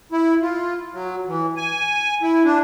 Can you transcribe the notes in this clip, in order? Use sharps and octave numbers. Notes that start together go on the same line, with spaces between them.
E4
F4
F#3
E3
G#5
E4
D4